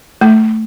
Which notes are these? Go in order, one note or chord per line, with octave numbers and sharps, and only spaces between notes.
A3